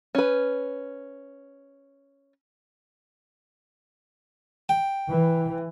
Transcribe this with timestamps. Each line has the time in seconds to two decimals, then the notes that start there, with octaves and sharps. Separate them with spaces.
0.15 C#4 B4
4.69 G5
5.09 E3